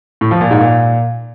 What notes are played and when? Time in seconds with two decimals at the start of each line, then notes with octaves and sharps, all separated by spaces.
0.21 A2
0.31 F3
0.41 A#2
0.51 G#2
0.60 A#2